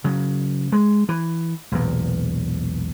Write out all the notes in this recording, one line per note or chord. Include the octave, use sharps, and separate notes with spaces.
C#3 F#3
G#3
E3
B1 E2 A#2